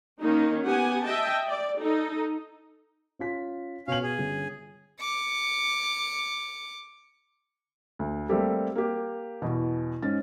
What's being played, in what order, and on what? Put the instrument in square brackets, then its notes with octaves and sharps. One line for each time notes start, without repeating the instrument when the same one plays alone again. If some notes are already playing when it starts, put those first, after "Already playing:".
[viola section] D#3 A#3 C#4 D#4
B3 G4 F#5 G#5
D#5 E5 G5 A5
D5
D#4 A4
[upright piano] C#4 F4 B6
[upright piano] B2 F#7 [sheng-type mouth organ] C#4 F5
[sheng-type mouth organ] G#4
[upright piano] G1 C#4
[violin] D6 C#7
[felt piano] D2
G3 A3 A#3 C4 G4 A4
A#3 G4
E2 B2
G#2 C#4 A6